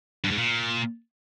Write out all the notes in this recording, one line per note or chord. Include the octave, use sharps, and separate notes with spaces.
G2
G#2
A#2